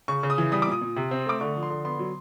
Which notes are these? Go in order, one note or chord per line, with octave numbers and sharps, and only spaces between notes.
C#3 C#6
C#3
D#6
E3
G3 D#6
D6
A#2 D#6
A#2
C3
C4
A3 D6
D3 C#6
F3
C6
D3
B3 C6
F#3